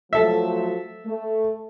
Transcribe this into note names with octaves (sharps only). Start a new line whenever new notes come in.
F3 F#3 A3 A4 E5
A3